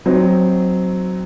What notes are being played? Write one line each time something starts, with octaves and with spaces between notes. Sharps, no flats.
F#3 C4 D#4